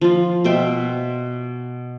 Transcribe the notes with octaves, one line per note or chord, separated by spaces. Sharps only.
F3 F4
B2 C5 E5 G5